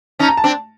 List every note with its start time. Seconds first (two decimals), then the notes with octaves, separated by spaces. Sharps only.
0.19 C#4 D#4 A5
0.28 A#5
0.37 A5
0.44 C4 D4